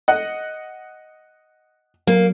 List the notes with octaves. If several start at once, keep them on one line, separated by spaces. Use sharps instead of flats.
D#5 F#5
F#3 A#3